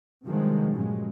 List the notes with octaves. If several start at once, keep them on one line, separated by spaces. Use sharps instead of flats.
G2 C3 D#3 F3 F#3 G#3
G2 A#2 C#3 F#3 G#3